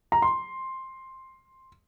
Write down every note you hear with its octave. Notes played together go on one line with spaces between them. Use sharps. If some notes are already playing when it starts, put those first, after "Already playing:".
A#5
C6